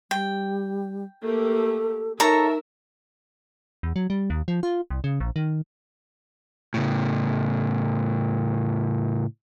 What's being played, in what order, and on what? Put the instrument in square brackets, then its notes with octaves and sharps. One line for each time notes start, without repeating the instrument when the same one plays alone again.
[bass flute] G3 [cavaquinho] G5
[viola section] A3 A#3 G4 [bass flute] A4
[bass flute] D#4 [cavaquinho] A4 C#5 A#5 [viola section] A#4 E5
[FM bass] E2
F#3
G3
D#2
F3
F4
C2
C#3
A#1
D#3
[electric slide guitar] A2 C#3